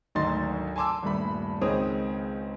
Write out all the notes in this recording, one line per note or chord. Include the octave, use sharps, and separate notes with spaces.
G#1 D2 F#3 D#4 C6 A6
G#5 A5 C6 D6 E6
D#1 G2 A3 B5
C#2 D#3 C4 G#4 C#5 D#6